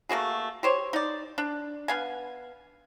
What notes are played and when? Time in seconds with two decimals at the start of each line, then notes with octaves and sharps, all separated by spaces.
0.09 A3 A#3 F#4 G#4
0.63 G4 C5 C#5
0.93 D#4 D5
1.38 D4
1.88 B3 F5 G#5